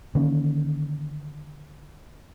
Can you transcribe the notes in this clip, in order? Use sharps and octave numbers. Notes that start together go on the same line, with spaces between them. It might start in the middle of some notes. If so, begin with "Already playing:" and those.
D3 D#3 A#3 C#4